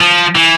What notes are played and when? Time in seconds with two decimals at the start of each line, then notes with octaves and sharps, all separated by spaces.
0.01 F3
0.36 E3